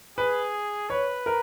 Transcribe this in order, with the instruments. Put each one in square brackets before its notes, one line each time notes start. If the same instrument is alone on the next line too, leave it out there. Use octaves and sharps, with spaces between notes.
[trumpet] G#4 [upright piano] B4
[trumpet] B4 [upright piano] C#5
[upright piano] A#4